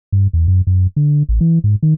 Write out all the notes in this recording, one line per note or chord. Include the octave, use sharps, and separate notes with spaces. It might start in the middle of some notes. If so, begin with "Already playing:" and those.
G2
E2
F#2
F#2
D3
A1
E3
G#2
D#3